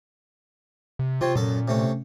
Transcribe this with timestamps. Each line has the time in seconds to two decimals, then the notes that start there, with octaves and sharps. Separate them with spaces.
0.99 C3
1.21 C3 C4 F4 C#5
1.36 F#2 A#2 A4
1.68 C3 A3 C#4